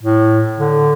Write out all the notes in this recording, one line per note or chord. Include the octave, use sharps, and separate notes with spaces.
A2
D3